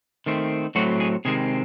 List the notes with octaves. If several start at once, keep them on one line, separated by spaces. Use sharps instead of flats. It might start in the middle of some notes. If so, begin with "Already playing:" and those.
D#3 A3 C4
A2 F#3 A3 C4 F#4
G#4
C3 D#3 G#3 C4 G#4